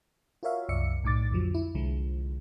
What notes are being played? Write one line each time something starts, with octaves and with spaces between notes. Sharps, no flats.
F4 F#4 A#4 C#5 E5 F5
C2 F#2 D5 E5 C#7
B1 A2 D#4 D6 A6
F2 D3 F3 F#3
E4
C2 D3 F3 G#3